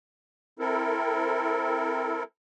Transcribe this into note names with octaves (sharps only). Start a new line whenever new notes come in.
C4 E4 A4 A#4